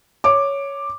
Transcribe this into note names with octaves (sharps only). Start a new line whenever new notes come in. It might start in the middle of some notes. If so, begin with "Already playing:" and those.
C#5 D6